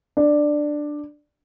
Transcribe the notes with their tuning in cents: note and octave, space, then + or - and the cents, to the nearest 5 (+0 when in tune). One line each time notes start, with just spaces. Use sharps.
D4 +10